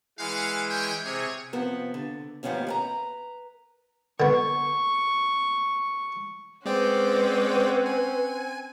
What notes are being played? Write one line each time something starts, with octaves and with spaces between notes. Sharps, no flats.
E3 G#3 F5 F#5
C#4 C#5 G5
C3 G#4 C#5
C3 F3 B3
D3
D#2 A2 F3 B3 C#4 G4
B4 G#5 A#5
D3 B3 C#6
G#3 C4 C#4 B4 C5 D5 F#5 G5
G#5